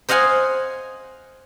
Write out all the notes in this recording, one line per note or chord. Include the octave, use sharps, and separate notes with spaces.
C5 D#5 F5 F#5 G#5 C6